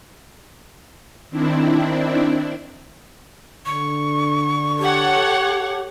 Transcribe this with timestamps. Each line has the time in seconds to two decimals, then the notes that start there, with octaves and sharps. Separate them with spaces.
1.30 D#3 C4 D4 E4
3.66 D3 C#6
4.79 G4 A4 C#5 F#5